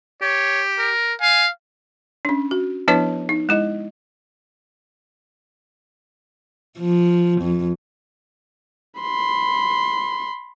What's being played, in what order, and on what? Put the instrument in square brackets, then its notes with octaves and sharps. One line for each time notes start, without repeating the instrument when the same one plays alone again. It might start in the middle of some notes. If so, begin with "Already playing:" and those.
[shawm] G4 [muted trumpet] C#5
[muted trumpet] A#4
[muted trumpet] F5 [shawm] G#5
[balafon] C#4 D4
F#4
F3 B3 D4 E4 B4 C#5
D#4
G#3 E4 D#5
[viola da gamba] F3
F2
[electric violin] B5 C6